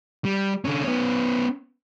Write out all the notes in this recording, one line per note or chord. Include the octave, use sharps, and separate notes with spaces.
G3
D3 C#4
B3 C#4